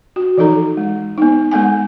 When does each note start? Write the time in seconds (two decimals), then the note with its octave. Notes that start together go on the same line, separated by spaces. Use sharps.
0.16 F#4
0.38 E3 F3 D#4 A4 A#5
0.77 G#3
1.18 B3 D#4
1.51 G#3 B3 F#5 G#5